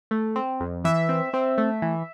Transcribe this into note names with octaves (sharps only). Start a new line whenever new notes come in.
A3
C4
F2
E3 E5
C4
C4
A3
E3